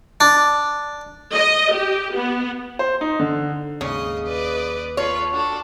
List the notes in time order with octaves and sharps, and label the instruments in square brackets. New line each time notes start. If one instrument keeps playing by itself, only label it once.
[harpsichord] D4
[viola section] D#5
G4
B3
[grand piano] C5
D#4
D3
[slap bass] D#2 [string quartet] G#2 D#5 D#6 [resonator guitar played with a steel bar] C#3
[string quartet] B4 D5 D#5
[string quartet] F4 A4 B4 [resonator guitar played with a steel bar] C#5
[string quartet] D4 F#4 A4